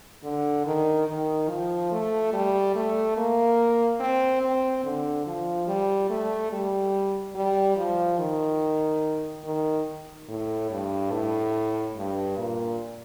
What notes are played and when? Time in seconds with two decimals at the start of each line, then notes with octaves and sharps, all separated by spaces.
0.23 D3
0.65 D#3
1.08 D#3
1.49 F3
1.91 A3
2.33 G3
2.75 A3
3.17 A#3
4.00 C4
4.42 C4
4.84 D3
5.27 F3
5.67 G3
6.10 A3
6.52 G3
7.35 G3
7.77 F3
8.18 D#3
9.44 D#3
10.28 A2
10.70 G2
11.11 A2
11.96 G2
12.38 A#2